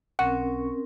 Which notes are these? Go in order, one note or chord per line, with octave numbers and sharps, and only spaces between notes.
B1 C4 C#4 A#4 F#5 C#6